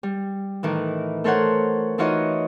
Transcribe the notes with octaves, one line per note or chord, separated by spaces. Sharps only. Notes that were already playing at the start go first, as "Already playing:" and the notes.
G3
A2 D#3 E3
A3 A4 A#4 C5 C#5 F#5
E3 D#4 F4 F#4 C#5 D#5